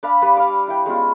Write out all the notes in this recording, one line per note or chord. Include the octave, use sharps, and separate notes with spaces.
D4 B4 F5 B5
G3 B4 D5 F5
F5 D6
E4 G5
G#3 B3 C#4 F4